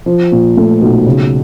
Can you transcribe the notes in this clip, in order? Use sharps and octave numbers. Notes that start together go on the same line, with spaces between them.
F3
A#2
A3
B1
C#3